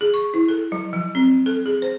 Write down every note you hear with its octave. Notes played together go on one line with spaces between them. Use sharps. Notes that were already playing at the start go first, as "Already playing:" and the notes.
G#4
C#6
E4
A4
F#3
F3
C4
A4
G#4
C5